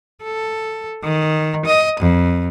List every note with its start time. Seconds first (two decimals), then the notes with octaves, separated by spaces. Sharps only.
0.23 A4
1.04 D#3
1.66 D#5
2.01 F2